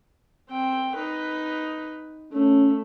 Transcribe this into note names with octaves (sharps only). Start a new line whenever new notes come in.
C4 G5
D#4 B4
A3 C#4